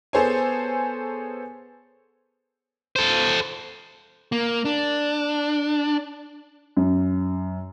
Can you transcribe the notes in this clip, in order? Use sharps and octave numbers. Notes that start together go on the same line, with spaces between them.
B3 G#4 A4 C5 C#5 G#5
A4 C5
A#3
D4
F#2